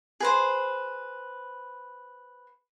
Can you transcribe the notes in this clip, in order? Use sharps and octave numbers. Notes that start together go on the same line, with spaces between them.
G#4 B4 C5